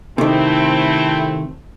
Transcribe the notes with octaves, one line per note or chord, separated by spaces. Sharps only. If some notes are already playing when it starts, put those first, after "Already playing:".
C3 D#3 A3 C4 E4